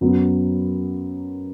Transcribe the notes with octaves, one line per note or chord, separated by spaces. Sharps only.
F#2 F#3 B3